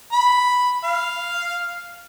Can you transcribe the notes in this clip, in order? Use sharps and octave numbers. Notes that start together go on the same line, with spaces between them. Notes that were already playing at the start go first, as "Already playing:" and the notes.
B5
F5